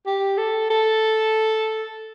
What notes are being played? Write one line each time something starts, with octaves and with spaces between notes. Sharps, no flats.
G4
A4
A4